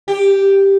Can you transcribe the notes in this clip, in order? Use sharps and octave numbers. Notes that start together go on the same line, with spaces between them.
G4